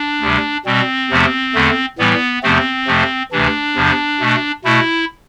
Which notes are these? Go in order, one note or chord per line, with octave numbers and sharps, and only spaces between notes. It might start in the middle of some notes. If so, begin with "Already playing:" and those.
Already playing: D4
D2 C3 G3
B2 G3 C4
E2 C3 F3 A3
E2 D3 A3
A2 E3 G3 B3
E2 C3 F3 A3 C4
F2 C3 F3 A3
D2 C3 E3 D4
E2 C3 F3
B2 A3
B2 A3 E4